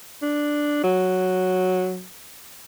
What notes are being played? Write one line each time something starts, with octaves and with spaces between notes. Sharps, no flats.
D4
F#3